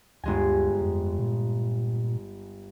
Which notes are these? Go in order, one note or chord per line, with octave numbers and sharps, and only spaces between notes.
G1 D2 G#3 G#5
F2
A#2